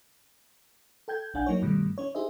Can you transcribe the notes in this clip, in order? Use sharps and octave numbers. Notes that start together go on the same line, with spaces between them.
A4 G5 G6 G#6
A#1 D4 F#5 G#5 G6
F#3 A#3 D#4 C#5
G2 B2 D#3 G3 A3
C#4 C#5
D#4 G4 G#4 C5 D#5 E5